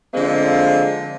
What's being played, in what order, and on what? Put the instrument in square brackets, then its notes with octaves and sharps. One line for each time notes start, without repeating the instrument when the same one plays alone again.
[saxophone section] D3 F3 G#3 A#3 C4